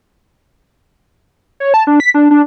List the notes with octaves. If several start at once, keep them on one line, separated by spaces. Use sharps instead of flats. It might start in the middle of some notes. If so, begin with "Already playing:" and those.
C#5
A5
D4
B6
D4
D4